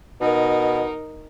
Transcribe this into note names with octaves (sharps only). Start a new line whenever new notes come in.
B2 D#4 A#4